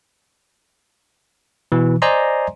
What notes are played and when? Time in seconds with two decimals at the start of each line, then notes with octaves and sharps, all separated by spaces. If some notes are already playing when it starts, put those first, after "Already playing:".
1.72 B2 E3
2.02 C5 D5 D#5 G#5 A#5 C6